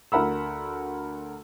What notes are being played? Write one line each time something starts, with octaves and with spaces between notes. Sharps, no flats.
D2 A#4 F#5 B5 E6